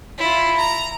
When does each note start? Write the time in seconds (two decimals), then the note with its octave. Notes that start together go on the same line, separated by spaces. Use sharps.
0.18 E4 F4
0.57 A#5